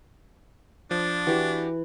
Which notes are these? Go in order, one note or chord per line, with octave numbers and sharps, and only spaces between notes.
F3 D4
E3 F#4 G4